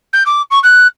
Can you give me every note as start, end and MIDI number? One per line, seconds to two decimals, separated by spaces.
0.13 0.24 91
0.26 0.42 86
0.51 0.59 85
0.64 0.87 90